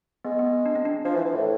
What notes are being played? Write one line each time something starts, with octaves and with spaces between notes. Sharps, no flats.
G#3 B3
B3
D4
C4
D4
F3 D4
E3
E3
A2